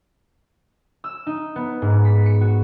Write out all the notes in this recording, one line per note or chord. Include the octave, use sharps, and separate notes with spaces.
E6
D#4
B3
G#2
B6
C#7
F#4